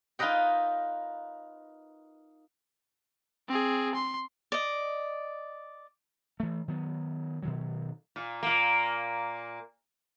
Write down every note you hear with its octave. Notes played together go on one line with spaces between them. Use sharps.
D#4 F4 A#4 B4 D#5 G5
C4 G#4
C6
D5 D#5
E3 A3
D#3 F#3 B3
B2 D#3 F#3
A#2
A#2 A#3